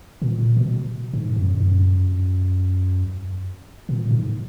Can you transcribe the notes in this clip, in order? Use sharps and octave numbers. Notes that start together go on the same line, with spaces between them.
A#2
B2
G#2
F#2
F#2
A#2
G#2